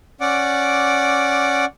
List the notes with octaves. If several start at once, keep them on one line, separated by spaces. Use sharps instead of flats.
C#4 D5 F#5 D6